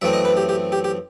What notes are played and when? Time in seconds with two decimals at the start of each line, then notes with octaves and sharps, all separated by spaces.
0.02 F#2 E3 A3 C4 E5
0.13 D#5
0.25 B4
0.37 G4
0.49 G4
0.72 G4
0.84 G4